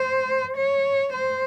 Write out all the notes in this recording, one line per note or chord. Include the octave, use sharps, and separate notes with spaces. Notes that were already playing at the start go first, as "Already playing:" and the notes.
Already playing: C5
C#5
C5